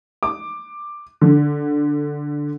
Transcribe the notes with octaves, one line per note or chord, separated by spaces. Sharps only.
D6
D3